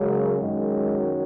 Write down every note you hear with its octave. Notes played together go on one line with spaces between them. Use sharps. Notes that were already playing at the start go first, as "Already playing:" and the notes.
Already playing: F#2 C#3 F#3 G#3
F#2 D#3 F#3 G#3